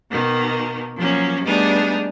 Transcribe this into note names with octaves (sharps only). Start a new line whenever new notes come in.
B2 D#3 A#3
F3 F#3 A#3 C#4
G3 A3 B3 D4 D#4 G#4